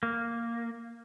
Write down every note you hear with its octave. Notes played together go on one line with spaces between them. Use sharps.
A#3